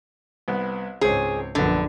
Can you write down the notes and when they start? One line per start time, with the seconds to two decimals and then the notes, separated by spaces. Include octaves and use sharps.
0.48 C2 B3
1.01 C#2 G#2 C4 G#4 C#5
1.55 A#1 F#2 D3 B3 A4